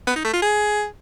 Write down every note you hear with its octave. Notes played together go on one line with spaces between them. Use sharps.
B3
D#4
A3
F4
G#4